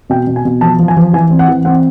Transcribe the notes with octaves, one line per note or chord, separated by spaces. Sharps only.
B2 G5
B2
G#5
B2
F3 A5
F3
G#5
F3
E3 G#5
C4
F#5
E3
C4 F#5